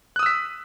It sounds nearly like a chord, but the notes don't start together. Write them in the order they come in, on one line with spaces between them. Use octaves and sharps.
F#6 D#6 E6 B6